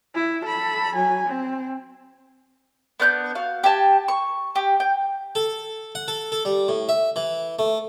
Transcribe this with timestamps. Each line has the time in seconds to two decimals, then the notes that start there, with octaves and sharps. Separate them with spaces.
0.15 E4
0.45 A4 B5
0.95 F#3 G#5
1.27 C4
3.00 B3 D4 F#6 G6
3.35 F#4 F5
3.64 G4 G#5 A5
4.08 C#6
4.55 G4
4.80 G5
5.35 A4
5.95 F#5
6.08 A4
6.32 A4
6.45 G3
6.68 A2
6.89 E5
7.16 E3
7.59 A3